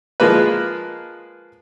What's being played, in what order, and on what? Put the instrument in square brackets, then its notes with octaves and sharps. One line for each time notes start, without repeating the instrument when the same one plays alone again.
[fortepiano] F3 G#3 A#3 B4